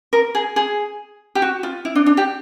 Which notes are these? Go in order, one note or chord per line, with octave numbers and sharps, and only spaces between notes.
A#4
G#4
G#4
G4
F#4
F4
E4
D4
D4
G4